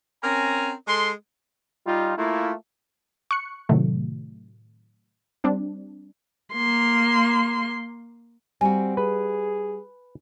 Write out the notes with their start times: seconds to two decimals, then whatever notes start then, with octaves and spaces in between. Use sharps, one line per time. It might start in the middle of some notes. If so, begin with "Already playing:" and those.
0.23 C4 C#4 A#4 G#5 A#5
0.88 G#3 A4 D#5 C6
1.86 G3 D#4 F4
2.17 A3 A#3 E4 F4
3.31 C#6 F#6 C#7
3.69 A2 C3 D#3 F#3 A3
5.44 G3 C4 D4
6.53 A#3 C6
8.61 G3 C4 F#4 G#5
8.97 G#4 B4